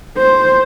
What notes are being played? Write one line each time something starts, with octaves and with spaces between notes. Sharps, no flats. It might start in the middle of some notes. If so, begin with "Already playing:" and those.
C5